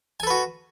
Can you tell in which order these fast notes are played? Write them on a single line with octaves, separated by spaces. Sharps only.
G#5 A4 B4 F#4